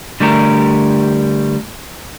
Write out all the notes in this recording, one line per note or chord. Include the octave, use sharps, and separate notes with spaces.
D3 G3 A3 G4 A#4